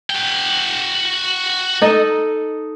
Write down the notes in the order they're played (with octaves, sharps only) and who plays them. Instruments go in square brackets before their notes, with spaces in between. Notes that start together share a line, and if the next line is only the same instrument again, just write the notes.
[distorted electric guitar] F#4 G5
[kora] D#4 A4 D#5